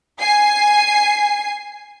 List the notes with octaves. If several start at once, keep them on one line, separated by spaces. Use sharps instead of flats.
G#5 C7